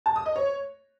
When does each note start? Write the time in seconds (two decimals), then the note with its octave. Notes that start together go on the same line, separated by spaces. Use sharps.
0.06 A5
0.16 D#6
0.26 D#5
0.36 C#5